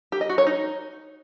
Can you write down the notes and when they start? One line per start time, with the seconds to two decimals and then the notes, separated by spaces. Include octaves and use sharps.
0.12 G4
0.21 D#5
0.29 F#4
0.38 C#5
0.47 D#4